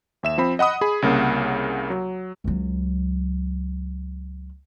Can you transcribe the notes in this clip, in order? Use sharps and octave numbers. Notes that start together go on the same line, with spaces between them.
D#2 E5 E7
F3 C4 B5
D#5 F#5 B5 D#6
G#4 B5
C2 C#3 A#3 F#5
F#3
C#2 F#3